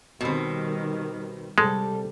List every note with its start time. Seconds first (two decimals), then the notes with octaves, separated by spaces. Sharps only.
0.21 B2 D#3 G3 C4
1.58 C3 G3 G#3 A4